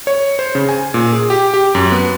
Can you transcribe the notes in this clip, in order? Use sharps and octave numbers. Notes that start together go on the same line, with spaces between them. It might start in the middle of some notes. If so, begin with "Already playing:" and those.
C#5
C5
C#3
G#5
A#2
G#4
G4
G4
F#2
B3